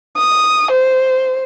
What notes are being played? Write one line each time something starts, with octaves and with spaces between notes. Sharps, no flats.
D#6
C5